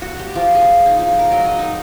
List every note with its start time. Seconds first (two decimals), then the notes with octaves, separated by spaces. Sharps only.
0.02 F#4
0.19 G4
0.36 F3
0.55 G#4
0.86 D#4
0.99 F3
1.19 A#4
1.32 F#3
1.45 D#5
1.59 D#4